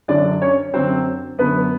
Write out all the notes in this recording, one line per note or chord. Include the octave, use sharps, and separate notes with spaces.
F#2 D3 F#3 D4 D5
C#4 C#5
F#2 D3 F#3 C4 C5
F#2 D3 F#3 B3 B4